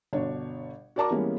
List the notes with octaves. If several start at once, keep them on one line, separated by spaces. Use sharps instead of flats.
G1 B2 D4 C#5
F#4 A#4 D5 A5 A#5 D6
E3 G3 G#3 A#3 B3 C#4